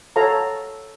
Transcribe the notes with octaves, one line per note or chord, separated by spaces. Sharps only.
F#4 A4 C#5 F5 A#5